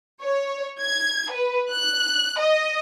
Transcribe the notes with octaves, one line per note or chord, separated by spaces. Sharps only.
C#5
G#6
B4
F#6
D#5